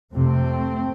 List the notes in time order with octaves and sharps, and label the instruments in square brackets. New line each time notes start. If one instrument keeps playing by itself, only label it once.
[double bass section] F2 C3 A3 C4